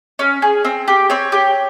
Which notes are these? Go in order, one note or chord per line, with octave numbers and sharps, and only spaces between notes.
C#4
G#4
C4
G4
C4 C#5
G4